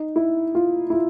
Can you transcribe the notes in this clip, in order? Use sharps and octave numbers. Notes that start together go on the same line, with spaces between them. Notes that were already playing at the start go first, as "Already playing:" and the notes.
Already playing: D#4
E4
F4
E4
F4